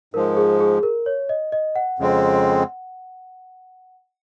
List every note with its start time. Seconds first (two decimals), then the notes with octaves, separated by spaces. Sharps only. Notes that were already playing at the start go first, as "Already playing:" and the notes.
0.14 G#2 F3 G#3 A#4
0.37 G#4
0.60 G#4
0.83 A#4
1.06 C#5
1.29 D#5
1.52 D#5
1.76 F#5
1.99 F2 C#3 G#3 C4